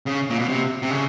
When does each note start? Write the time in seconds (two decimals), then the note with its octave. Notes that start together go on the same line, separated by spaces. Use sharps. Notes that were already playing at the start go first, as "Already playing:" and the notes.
0.06 C#3
0.30 A#2
0.39 B2
0.49 C3
0.82 C3
0.91 C#3